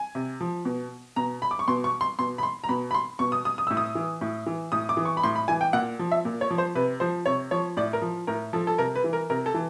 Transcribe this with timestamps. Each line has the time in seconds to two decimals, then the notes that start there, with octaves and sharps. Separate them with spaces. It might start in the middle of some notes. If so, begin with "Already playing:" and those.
Already playing: G#5
0.15 C3
0.40 F3
0.65 B2
1.16 B2 A#5
1.42 B5
1.51 D6
1.59 C#6
1.68 B2 C6
1.84 C#6
2.01 C6
2.19 B2 C6
2.38 B5
2.43 C6
2.64 A#5
2.69 B2 B5
2.91 B5
2.94 C6
3.19 B2 C#6
3.32 D#6
3.45 D#6
3.58 D#6
3.67 A2 E6
3.77 D#6
3.95 E3
4.21 A2
4.46 E3
4.72 A2 D#6
4.89 D6
4.97 E3
5.05 C#6
5.17 B5
5.23 A2 C6
5.35 B5
5.48 E3 G#5
5.61 G5
5.73 A#2 F#5
5.99 F3
6.12 E5
6.25 A#2
6.41 C#5
6.50 F3
6.58 C5
6.75 C3 B4
7.00 F3 C5
7.26 C3 C#5
7.51 F3 C#5
7.77 A2 D5
7.93 A#4
8.02 F3
8.27 A2 A#4
8.53 F3 A4
8.67 A4
8.78 C3 A#4
8.95 B4
9.04 E3
9.13 A#4
9.30 C3 A#4
9.46 A4
9.54 E3